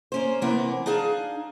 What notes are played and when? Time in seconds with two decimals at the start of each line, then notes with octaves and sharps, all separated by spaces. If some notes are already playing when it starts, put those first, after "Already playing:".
0.12 A#3 C#4 C5
0.42 C3 E3 A#3 B3
0.86 D4 D#4 G#4 F5 A5